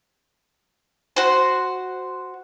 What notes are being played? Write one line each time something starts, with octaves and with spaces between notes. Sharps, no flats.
F#4 C5